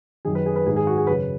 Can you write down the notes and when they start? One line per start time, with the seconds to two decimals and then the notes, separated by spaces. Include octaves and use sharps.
0.25 F#2 D#3 G#4
0.35 B4
0.46 G#4
0.56 B4
0.66 G#2 D#3 G#4
0.76 G#4
0.87 F#4
0.98 G#4
1.07 F#2 B4
1.11 C#3